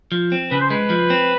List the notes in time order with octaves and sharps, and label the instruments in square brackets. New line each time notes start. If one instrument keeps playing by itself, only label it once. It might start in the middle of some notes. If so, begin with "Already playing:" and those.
[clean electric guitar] F3
C4
[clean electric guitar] C#3 [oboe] B4
[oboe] C5
[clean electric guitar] G#3 [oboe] B4
[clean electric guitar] F3
C4